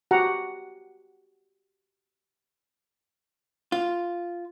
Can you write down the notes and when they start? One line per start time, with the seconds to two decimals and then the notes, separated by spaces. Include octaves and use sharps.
0.11 F#4 G4 F#5 A#5
3.72 F4